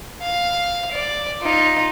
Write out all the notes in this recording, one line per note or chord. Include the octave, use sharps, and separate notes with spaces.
F5
D5
D#4 F4